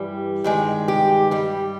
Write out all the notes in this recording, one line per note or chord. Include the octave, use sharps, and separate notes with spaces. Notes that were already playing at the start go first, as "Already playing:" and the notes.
Already playing: G2 E3 G3
G2 D#3 G#3
G4
G2 G3